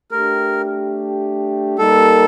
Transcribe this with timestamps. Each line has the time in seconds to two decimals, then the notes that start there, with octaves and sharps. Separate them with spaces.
0.11 A3 D4 G4 A#4
1.78 G3 A#3 D#4 A4 A#4